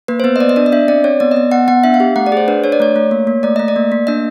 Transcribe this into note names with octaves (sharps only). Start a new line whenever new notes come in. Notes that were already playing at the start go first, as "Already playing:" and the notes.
A#3 B4
C5
B3 B4
D#5
B3 D5
D#5
D4 D5
D#5
D4 E5
C4 D5
C4 C#5
B3 D5
D#5
B3
B3 F#5
B3 F#5
D4 E5
F5
G4
A3 F#5
D5
G#4 C5
D4 B4
D4 C#5
D5
A3 C#5
A3
A#3
A#3
A3 D5
A3 D#5
D5
A#3
A#3
D4 D#5